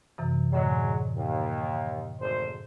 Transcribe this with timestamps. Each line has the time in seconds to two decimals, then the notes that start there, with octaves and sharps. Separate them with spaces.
0.18 F#2 C3 E3
0.53 A2 D3 F#3 G#3
1.16 D#2
2.20 G#1 D2 C5